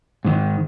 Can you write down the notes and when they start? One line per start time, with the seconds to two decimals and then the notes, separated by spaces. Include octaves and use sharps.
0.25 G#2 D#3